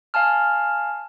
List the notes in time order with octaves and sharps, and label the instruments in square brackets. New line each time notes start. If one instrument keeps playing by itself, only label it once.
[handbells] F5 G#5 A5 F6